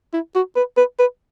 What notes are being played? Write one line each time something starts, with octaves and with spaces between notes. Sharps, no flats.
E4
F#4
B4
B4
B4